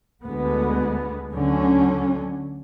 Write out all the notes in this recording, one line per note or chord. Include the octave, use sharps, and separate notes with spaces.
D2 D3 G#3 B3
D2 D3 F#3 C#4